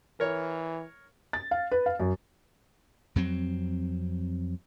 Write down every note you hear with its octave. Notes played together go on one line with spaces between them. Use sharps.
E3 A#4 C#5
A6
F5
B4
F5
F#2
F2 F#3 C4